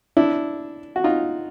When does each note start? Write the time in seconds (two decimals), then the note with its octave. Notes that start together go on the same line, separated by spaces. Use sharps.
0.17 D4 E4
0.96 F#4
1.04 D#4 F4